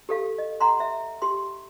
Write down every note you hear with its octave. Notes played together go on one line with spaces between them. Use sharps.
G4 A4 F5
D#5
F#5 A#5 C6
E5
G4 C6